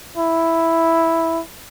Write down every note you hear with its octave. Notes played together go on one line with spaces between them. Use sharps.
E4